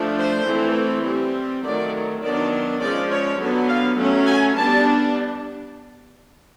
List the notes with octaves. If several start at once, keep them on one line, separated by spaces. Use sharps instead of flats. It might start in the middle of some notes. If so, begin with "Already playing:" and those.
Already playing: F3 A3 D4
C5
E3 A3 C4
G3 C4
D#3 F#3 A3 D5
D#3 F#3 B3 D4 D5
F3 G#3 C#4 D5
C#5
D3 F#3 B3
F5
F#3 A3 C#4
G#5
G3 B3 D4 A5